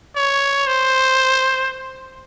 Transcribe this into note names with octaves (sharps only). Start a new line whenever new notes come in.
C#5
C5